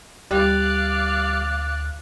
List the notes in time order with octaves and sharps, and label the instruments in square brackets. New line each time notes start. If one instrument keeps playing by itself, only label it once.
[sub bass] D2 [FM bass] G3 [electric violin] D5 F5 [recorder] F#6